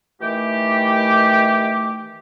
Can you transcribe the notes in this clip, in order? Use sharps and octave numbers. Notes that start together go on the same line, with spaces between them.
D#3 E3 A3 G4